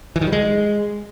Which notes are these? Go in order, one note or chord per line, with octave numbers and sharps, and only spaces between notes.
E3
D#3
G3
G#3